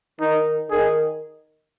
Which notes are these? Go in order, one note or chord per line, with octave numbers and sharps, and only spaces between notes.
D#3 D#4
D#3 G#4